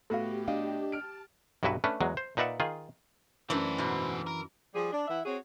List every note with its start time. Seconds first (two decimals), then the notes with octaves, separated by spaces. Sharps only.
0.10 A2 B3 F#4 G4 A4 F5
0.48 D4 D#5 F5 G5
0.92 A5 F6 D7
1.63 B1 G2 F#3 E4 F#4 B4
1.84 A3 C#4 D4 B4
2.01 E2 F#3 G#3
2.17 C5
2.37 A#2 D#4 B4 D5 E5 F#5
2.60 D#3 F4 G#4
3.50 F#2 E3 A3 D4 C5
3.78 G#2 B2
4.27 A#4
4.75 F3 G3 G#4
4.92 D4
5.08 E3 E4 E5 F#5
5.25 C4 F#4 G#4 C#5